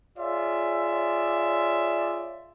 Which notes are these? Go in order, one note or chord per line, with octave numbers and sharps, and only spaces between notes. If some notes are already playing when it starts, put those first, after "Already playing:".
F4 G#4 C#5 D5 E5